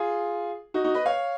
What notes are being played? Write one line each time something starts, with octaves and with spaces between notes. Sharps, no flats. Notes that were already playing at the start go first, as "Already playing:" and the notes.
Already playing: F4 G#4
D#4 F#4
D#4 F#4
B4 D#5
C#5 F5